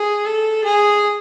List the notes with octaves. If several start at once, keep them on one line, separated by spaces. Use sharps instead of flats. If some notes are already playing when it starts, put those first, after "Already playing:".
Already playing: G#4
A4
G#4